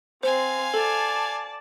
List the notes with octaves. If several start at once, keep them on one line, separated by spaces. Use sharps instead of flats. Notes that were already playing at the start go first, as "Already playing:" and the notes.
C4 C5 F5 G#5 C6
A4 D5 A5